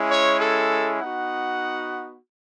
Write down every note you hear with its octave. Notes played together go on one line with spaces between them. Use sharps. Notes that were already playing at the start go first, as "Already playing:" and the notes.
Already playing: G#3 C#4 E4
C#5
A4
B3 D#4 F#4 F#5